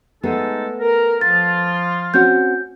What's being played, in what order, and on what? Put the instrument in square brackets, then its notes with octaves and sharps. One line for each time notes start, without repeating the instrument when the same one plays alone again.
[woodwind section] G#3 D#4 A4 [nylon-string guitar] A3 B3 G#4
[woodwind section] A#4
[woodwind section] F3 F4 [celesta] A6
[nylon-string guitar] C4 C#4 F#4 [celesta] G6